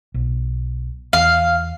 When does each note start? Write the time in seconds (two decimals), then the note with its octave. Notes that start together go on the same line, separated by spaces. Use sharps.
0.14 B1
1.13 E2 F5